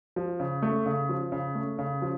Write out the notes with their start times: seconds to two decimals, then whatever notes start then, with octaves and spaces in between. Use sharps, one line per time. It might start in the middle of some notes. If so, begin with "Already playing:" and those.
0.16 F3
0.40 C#3
0.62 A3
0.86 C#3
1.09 F3
1.32 C#3
1.55 A3
1.79 C#3
2.02 F3